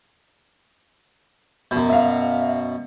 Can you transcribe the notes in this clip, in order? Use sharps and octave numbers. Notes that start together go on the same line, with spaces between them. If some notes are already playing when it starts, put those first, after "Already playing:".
F#2 B2
E5 F5